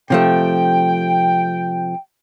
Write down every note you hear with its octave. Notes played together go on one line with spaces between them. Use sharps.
C3 F3 A3 G5